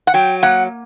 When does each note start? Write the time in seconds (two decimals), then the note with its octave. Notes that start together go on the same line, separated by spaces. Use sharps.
0.07 F#5
0.14 F#3 G5
0.43 A#3 F#5